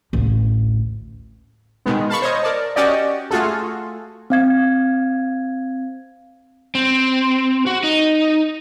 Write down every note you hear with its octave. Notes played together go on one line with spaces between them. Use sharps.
A1 D2
B2 D#3 G#3 B3
F5 A5 B5 C#6
C5 C#5 D#5
A#4 D5 A5
C#4 F#4 G4 D5 D#5
A3 F4 F#4 G#4 A4
C4 F5 G#6
C4
F#4
D#4